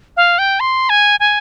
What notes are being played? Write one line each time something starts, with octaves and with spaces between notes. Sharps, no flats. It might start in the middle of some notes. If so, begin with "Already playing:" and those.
F5
G5
C6
G#5
G#5